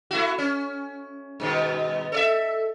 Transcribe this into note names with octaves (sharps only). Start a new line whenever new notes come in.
A3 E4 F#4
C#4
G2 B2 D#3
A4 D5 E5